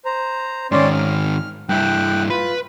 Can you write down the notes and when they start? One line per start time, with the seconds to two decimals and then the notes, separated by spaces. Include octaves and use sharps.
0.05 C5 A#5
0.72 G#2 D#3 C#4 D5 C6
0.93 F6
1.69 G2 E4 G5 F#6
2.30 F4 B4